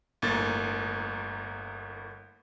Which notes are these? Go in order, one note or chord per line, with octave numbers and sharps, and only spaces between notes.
G1 A2 A#3 A6